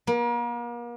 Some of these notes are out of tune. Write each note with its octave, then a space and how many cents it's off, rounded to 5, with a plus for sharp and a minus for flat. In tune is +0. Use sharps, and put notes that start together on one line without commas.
A#3 +40